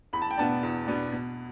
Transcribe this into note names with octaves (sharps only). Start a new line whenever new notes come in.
E2 B5
A5
G5
B2 B3 D4 A5
E2
B2 B3 D4
B2